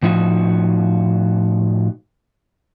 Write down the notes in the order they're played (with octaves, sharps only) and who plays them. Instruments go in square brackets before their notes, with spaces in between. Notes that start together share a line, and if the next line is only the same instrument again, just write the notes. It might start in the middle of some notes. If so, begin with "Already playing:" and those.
[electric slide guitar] A2 F3 D#4 F#4